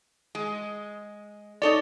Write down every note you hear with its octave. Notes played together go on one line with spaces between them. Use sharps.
G#3
D#4 A4 C#5 D5